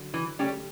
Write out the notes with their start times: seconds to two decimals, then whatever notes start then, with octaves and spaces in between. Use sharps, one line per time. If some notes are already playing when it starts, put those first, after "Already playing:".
Already playing: D3 F#3
0.14 E3
0.39 G3 A3 C#4 G4
0.52 G3